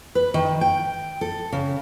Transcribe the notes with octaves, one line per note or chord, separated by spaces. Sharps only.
B4
D#3
G5
A4
C#3